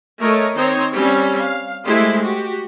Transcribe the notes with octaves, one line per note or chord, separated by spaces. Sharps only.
A3 A#4 C#5 D#5
D#3 C4 D#4 C5 C#5
G3 C4 C#4
F5
G#3 A3 E4 G4 C5
F#4 G4